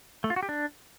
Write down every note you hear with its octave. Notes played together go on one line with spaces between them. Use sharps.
A3
F4
F#4
G4
D4